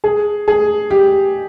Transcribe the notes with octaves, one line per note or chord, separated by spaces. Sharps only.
G#4
G#4
G4